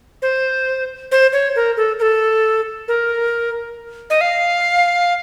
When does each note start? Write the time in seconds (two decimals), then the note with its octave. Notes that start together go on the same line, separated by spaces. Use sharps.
0.22 C5
1.12 C5
1.33 C#5
1.56 A#4
1.77 A4
1.99 A#4
2.02 A4
2.88 A#4
4.10 D#5
4.21 F5